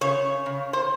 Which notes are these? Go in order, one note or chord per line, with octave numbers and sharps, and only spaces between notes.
C#3 C#5
C#3
C5